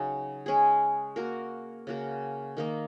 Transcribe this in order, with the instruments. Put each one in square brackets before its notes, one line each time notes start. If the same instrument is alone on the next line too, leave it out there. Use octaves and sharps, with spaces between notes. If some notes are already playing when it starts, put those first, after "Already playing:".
Already playing: [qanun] C#3 F#3 D#4
G#3 C#4 G#4
A#3 F#4 A#4
C#3 A#3 F#4 A#4
D#3 A#3 D#4